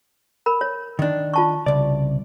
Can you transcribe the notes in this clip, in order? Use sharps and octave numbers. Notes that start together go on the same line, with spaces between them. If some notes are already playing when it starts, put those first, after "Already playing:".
A#4 B5
C#5
D#3 D4
F4 A5 C#6
C2 C#3 D5